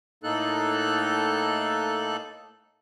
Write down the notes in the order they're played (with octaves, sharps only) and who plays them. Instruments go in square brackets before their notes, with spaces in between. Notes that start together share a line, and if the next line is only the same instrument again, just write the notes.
[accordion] A2 A#3 D#4 A4 F#6